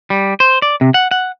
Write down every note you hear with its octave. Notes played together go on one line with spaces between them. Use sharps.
G3
C5
D5
C3
F#5
F#5